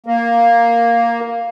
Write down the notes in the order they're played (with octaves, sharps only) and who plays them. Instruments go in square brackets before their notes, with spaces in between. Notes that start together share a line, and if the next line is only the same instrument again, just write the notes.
[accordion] A#3